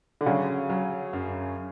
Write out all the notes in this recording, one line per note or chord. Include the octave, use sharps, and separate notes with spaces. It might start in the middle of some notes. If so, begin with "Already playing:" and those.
D3
C#3 F#3
F#3
F#2